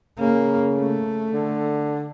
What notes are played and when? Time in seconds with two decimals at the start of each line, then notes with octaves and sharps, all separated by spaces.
0.19 C#3 A#3
0.75 A3
1.30 D3